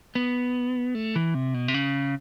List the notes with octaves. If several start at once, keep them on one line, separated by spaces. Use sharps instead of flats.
B3
A3
E3
C3
B2
C3
C#3